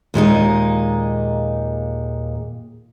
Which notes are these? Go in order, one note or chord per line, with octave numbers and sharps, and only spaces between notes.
D#2 A#2 G#3 D#4